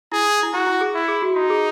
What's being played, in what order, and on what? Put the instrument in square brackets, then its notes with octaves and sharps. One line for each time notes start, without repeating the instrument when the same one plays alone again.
[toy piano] E4 [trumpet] G#4
[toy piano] E4
[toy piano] E4 [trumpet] F#4
[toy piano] E4
G#4
[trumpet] E4
[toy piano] G#4
F#4
[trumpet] D#4 [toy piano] F#4
[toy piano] G#4